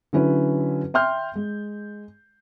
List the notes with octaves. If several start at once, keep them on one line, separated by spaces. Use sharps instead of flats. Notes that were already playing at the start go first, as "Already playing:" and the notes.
D3 F#3 C#4 E4 B4
E5 G5 C6 F6 G6
G#3